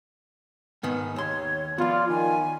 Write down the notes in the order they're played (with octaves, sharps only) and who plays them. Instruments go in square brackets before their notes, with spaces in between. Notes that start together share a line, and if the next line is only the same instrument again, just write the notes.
[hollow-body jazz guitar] G#2 D#3 B3
[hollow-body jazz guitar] D#2 C6 [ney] C#5
[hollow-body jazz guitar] F3 B3 [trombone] F4 [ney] D5
[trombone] D#3 [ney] G#5